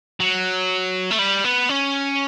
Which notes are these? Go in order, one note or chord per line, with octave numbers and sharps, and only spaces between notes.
F#3
A3
G3
B3
C#4